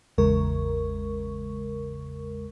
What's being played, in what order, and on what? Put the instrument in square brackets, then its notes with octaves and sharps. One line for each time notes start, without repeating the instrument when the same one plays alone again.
[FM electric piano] A1 E2 C#3 G#3 A#4 C#6